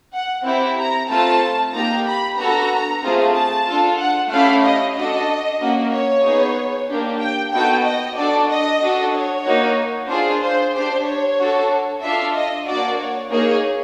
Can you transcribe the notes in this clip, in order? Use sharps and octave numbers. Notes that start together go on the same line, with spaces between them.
F#5
C4 E4 G4
A#5
A3 C4 F4 A4 A5
A#3 D#4 G4 A#5
B5
B3 D4 F#4 A4 A#5
A3 C4 F4 G#4
A5
D4 F4 A4
F#5
A3 C#4 E4 G4 F5
D#5
D4 F#4 A4 D#5
A#3 C#4 F#4
C#5
B3 D#4 G#4
A#3 D4 G4
G5
B3 D#4 F#4 A4 G5
D#5
D4 F#4 A4 D5
D#5
D4 F#4 A4
C#5
A#3 D#4 F#4
D4 F4 G#4 C5
C5
D4 G4 C5
C#5
D4 F#4 A4
D4 F4 A4 E5
D#5
A#3 D4 F#4 D5
C#5
A#3 D#4 G#4 C#5